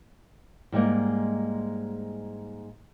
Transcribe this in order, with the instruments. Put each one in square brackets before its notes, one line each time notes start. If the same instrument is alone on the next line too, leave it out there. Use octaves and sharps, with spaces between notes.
[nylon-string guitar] G#2 G3 G#3 A#3